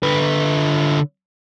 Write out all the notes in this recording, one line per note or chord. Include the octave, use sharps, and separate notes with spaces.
D3 B4